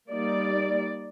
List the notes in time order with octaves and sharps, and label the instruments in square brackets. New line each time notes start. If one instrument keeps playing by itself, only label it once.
[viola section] G3 A#3 D#4 D5